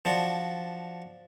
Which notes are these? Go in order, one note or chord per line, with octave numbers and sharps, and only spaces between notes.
F3 D4 F#4